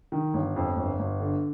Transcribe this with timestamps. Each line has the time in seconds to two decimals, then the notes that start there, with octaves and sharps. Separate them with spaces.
0.12 D#3
0.34 G1
0.56 F2
0.76 G1
0.99 G1
1.19 D3